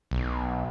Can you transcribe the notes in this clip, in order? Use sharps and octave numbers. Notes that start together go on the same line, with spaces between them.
B1